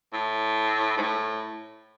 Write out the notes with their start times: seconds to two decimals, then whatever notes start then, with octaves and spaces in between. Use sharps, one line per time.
0.13 A2
0.97 G#2
1.02 A2